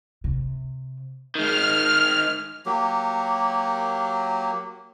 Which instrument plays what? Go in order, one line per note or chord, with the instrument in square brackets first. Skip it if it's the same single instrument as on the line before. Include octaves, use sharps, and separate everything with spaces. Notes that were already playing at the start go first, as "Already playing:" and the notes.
[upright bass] C3
[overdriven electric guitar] D#3 G#3 [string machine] F6
[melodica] F#3 A#3 G4